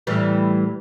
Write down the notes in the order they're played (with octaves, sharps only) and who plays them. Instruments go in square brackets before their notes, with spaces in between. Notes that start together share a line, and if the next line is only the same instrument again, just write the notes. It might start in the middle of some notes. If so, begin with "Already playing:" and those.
[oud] A2 E3 G3